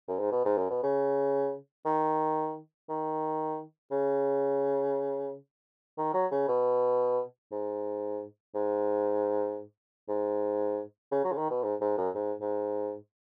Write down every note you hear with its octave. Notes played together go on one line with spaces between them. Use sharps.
F#2
G#2
B2
G#2
F#2
B2
C#3
D#3
D#3
C#3
D#3
F#3
C#3
B2
G#2
G#2
G#2
C#3
F#3
C#3
D#3
B2
G#2
G#2
F#2
G#2
G#2